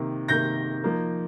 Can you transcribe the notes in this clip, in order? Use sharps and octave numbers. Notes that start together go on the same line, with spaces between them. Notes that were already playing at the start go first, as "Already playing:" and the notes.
Already playing: C3 D#3 A#3
C3 D#3 A#3 G6 A#6
F3 A#3 D#4